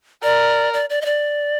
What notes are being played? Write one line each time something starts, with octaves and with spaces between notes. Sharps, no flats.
A#4 D5
D5
D5
D#5
D5